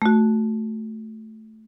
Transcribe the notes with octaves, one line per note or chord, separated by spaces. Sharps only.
A3 F#4